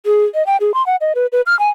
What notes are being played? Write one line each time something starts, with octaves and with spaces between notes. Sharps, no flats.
G#4
D#5
G5
G#4
C6
F#5
D#5
B4
B4
F6
G#5